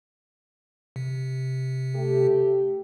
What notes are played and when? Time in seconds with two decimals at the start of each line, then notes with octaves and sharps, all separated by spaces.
0.96 C3
1.94 A3 G4